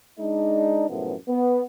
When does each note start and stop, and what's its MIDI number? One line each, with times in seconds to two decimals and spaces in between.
0.19 0.87 56
0.19 0.87 62
0.19 0.87 63
0.89 1.15 42
0.89 1.15 45
0.89 1.15 48
0.89 1.15 52
0.89 1.15 53
0.89 1.15 59
1.29 1.63 59